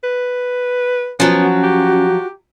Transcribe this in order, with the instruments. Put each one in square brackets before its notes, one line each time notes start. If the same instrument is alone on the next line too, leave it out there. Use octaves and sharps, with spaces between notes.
[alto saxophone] B4
[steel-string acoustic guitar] F3 F#3 [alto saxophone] B3 [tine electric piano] C#4
[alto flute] F#4
[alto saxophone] G4